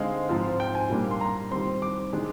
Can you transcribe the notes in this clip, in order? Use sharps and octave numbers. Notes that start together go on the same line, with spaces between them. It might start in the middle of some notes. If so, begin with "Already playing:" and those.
Already playing: D3 G#3 C4 D#4 F5
G#2 F3 C4 F4
G5
G#5
A#2 G3 A#3 D4
C6
A#5
D#3 G3 C4 C6
D6
D#3 G#3 D4